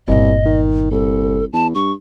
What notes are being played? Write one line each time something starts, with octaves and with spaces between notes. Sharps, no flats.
G1 C2 A#2 D#5
D#3
C2 A4
E2 A5
G2 C#6